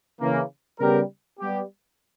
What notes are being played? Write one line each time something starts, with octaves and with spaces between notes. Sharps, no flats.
C#3 E3 A#3
C#3 G3 B3 G4 A#4
G3 B3 G4